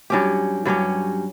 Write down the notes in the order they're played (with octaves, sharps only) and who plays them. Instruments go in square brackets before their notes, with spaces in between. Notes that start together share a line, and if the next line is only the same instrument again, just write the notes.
[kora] G2 F#3 C#4 G4
G2 F#3 C#4 G4